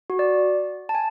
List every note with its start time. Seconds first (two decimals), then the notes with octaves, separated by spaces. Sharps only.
0.10 F#4
0.19 D5
0.89 A5
0.95 G#5